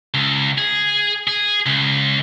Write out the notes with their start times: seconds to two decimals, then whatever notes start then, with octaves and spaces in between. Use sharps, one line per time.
0.14 C#2
0.58 G#4
1.27 G#4
1.66 C#2